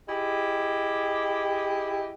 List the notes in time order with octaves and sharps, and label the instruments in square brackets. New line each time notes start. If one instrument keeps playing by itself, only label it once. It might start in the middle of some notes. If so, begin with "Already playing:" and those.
[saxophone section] E4 G4 G#4 D#5